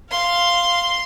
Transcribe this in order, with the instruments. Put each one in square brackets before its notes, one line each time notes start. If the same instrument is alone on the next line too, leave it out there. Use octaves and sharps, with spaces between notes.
[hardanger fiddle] F5 [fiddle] C6